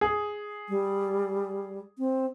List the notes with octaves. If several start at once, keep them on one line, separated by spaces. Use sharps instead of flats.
G#4
G3
C4